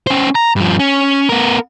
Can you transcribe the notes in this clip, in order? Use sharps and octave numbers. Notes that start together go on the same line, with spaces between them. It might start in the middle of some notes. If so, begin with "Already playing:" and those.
C#4 C5
A#5
G2 F3
C#4
B3 A#4